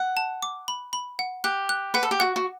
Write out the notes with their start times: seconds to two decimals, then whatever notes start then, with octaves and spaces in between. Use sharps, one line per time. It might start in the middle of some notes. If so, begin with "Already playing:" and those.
Already playing: F#5
0.17 A5
0.42 D6
0.68 B5
0.93 B5
1.19 F#5
1.44 G4 F#6
1.69 F#6
1.94 B4 F#5
2.03 A4
2.11 G4
2.20 F#4 F#5
2.36 F#4